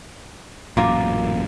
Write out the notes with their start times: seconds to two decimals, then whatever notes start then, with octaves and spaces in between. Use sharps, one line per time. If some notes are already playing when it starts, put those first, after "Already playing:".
0.77 A1 F#2 A#2 F4 A#4 D6